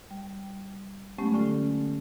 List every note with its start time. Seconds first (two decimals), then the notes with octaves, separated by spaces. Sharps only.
0.11 G3
1.18 F#3 G#3 A3 B3 C#4 G4
1.34 D3 C#4 F4 A4